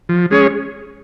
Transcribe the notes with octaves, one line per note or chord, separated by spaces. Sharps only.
F3
G#3 C#4 G#4 C#5